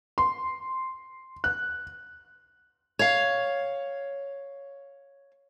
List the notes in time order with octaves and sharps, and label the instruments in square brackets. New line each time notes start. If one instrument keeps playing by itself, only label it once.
[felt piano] C6
F#6
[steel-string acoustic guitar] C#5 F5